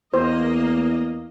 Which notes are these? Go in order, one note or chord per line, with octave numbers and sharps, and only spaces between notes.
E2 A#3 C5 D#5